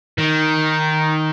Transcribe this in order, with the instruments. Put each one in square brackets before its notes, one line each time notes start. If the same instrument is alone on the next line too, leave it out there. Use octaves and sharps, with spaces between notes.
[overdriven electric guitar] D#3